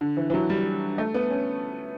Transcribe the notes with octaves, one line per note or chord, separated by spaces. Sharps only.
D3
E3
E3
F#3
G3
A3
B3
C#4